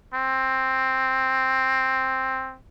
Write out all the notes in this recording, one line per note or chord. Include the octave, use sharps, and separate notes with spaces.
C4